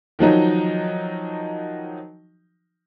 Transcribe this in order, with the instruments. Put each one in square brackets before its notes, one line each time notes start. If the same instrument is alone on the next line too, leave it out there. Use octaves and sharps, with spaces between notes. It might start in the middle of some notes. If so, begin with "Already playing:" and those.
[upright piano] D#3 F3 F#3 D#4